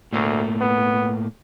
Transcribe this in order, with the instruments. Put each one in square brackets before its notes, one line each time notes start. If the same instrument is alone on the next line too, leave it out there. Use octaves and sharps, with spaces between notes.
[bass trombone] D2 [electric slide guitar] A2 A3 A#3
[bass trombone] B3